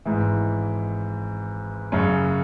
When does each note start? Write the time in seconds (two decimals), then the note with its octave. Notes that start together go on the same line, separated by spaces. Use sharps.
0.05 G#1 G#2 E3
1.92 F#2 C#3 F#3 C#4